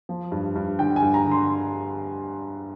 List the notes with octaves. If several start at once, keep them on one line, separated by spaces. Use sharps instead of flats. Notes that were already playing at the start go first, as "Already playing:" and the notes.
F3
G2
G2
D3 G5
G#5
G2
A#5
D3
C6